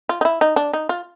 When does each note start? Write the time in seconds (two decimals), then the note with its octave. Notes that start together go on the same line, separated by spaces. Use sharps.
0.09 F4
0.21 D#4
0.25 E4
0.41 D#4
0.56 D4
0.73 D#4
0.89 F4